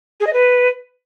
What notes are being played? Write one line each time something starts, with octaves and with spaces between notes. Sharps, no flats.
G#4
D#5
B4